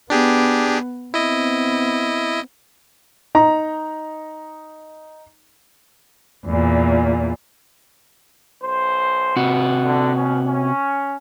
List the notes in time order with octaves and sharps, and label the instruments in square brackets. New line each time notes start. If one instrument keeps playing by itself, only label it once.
[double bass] B3 [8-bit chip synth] D4 G4 G#4
[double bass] B3 C4 [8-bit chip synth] E4 D#5
[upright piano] D#4 A#5
[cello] E2 A#2
[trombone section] B1 C5
[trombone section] C#2 [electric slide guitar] C3 F#4
[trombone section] D3
B2 C#4
C#4